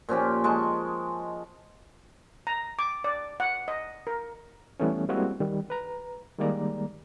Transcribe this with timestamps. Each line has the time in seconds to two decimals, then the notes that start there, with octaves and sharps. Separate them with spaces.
0.09 A#2 F3 C#4 G4
0.44 G#3 D#5 A5 C#6
2.47 A#5
2.79 D6
3.04 D5
3.40 F#5
3.68 D#5
4.07 A#4
4.80 E3 G3 A3 B3 C#4
5.09 G3 G#3 A#3 C4 E4 F#4
5.40 D#3 G3
5.70 B4 A#5
6.38 D#3 G3 G#3 A#3 D5 A#5